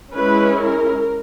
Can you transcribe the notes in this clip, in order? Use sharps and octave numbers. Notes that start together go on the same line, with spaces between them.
G#3 C#4 E4 B4
A#4